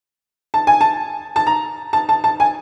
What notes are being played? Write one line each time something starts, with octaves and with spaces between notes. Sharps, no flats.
A5
G#5
A5
A5
A#5
A5
A5
A5
G#5